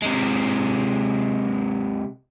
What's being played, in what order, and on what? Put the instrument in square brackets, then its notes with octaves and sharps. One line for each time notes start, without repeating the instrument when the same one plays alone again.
[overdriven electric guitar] C3 G#3